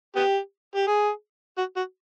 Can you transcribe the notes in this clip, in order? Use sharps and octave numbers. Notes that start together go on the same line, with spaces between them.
B3 G4
G4
G#4
F#4
F#4